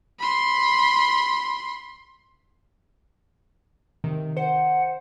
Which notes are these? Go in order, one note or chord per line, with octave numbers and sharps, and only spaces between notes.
B5 C6
C3 D#3
C5 F#5